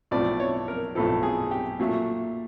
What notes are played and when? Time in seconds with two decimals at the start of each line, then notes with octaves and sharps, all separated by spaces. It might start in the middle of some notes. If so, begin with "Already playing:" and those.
0.11 B1 A2 F3 D5
0.40 C#5
0.68 A#4
0.95 B1 A2 F3 A4
1.23 G#4
1.51 G4
1.80 A#2 F#3 A3